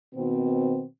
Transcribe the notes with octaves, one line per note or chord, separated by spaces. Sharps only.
B2 D#3 C4